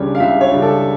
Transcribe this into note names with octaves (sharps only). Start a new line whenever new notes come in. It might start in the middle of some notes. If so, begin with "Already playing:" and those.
Already playing: C#2 C#3 G3 D4 C#5
F5
C#2 E5
C#5
C#3 G3 D4
A4